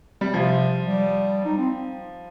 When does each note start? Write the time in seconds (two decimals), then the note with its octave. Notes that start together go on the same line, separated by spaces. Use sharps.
0.21 G3
0.33 C3 F3
0.87 G3
1.45 D#4
1.58 C4